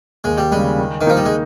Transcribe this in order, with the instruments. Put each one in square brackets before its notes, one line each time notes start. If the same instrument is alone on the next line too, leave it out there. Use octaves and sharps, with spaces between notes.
[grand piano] D#2 [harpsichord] G#3
[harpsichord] G3
[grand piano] C#3 G3 [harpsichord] G#3
[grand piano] D#3
[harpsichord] D#3
[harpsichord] F3 [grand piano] A#3 D#4 A#4
[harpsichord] G3
G#3